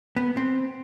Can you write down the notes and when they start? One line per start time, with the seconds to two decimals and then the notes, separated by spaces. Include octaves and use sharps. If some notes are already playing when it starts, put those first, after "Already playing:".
0.16 B3
0.37 C4